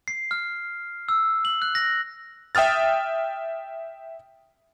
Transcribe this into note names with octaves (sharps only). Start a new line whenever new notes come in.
C7
F6
E6
F#7
F#6
A#6
E5 G5 D#6 F6 A6